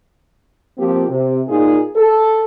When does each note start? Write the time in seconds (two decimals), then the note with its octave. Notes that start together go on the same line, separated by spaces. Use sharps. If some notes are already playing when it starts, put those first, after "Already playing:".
0.78 F3 A#3 C4 F4 G4
1.09 C3
1.48 A#2 D#4 F4 G#4
1.96 A4